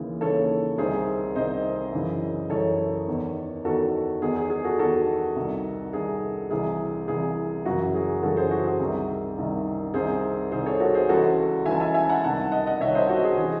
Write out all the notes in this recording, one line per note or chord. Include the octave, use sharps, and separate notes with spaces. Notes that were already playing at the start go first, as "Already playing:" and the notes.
Already playing: D#2 C#3 E3
D#2 C#3 E3 A4 C#5
C2 C3 D#3 G#4 C5
C2 C3 D#3 C5 D#5
F#2 C#3 E3
F#2 C#3 E3 A4 C#5
E2 D#3
E2 D#3 F#4 A4
E2 D#3 G#4
G#4
G#4
F#4 A4
E2 D#3 F#4 A4
C2 C3 D#3
C2 C3 D#3 G#4
C2 C3 E3 G#4
C2 C3 E3 G#4
F#2 C#3 E3 F#4
G#4
F#2 C#3 E3 F#4 A4
G#4 C5
F#4
G#4
C2 C3 D#3
C2 C3 D#3
C2 C3 D#3 G#4 C5
C2 C3 D#3 G#4 C5
A4 C#5
F#4 A4
G#4 C5
C#2 C#3 E3 F#4 A4
C#2 C#3 E3 E5 G#5
A5
E5 G#5
E5 G#5
F#5 A5
C2 C3 D#3 F#5 A5
D#5 F#5
D#5 F#5
C2 C3 D#3 C#5 E5
C5 D#5
F#4
G#4
E3 G#4